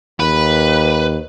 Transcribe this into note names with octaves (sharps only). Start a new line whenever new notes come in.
D#2 B4